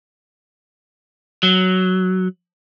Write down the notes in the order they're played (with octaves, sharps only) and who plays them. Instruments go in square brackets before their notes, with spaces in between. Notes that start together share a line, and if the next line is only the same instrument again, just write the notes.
[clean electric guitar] F#3